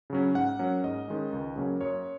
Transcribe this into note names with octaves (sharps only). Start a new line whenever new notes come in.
C#3 F#3 C#4
G#2 F#5
F#3 A#3 C#4
G#2 D#5
D#3 G#3 C#4
C#2
C#3 F#3 A#3 C#4
F#2 C#5